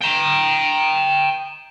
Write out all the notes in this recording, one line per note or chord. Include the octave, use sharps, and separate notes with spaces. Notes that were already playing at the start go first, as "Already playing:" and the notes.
G5 A#5